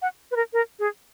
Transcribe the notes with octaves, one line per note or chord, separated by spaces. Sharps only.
F#5
B4
A#4
A#4
G#4